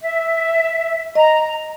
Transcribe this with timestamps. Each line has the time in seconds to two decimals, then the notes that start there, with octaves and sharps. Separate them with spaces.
0.01 E5
1.15 D#5 A#5